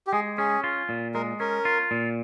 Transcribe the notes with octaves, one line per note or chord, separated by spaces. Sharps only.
G4
G#3 G#4
C#4 G#4
F4
A#2
G#3 A#4
C#4 A#4
F4
A#2